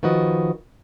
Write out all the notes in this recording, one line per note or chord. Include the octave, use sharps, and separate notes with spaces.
D#3 F3 F#4 B4 D#5